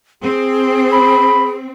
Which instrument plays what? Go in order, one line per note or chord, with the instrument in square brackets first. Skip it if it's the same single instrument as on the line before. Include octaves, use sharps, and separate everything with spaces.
[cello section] C4 [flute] G#4
[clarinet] B5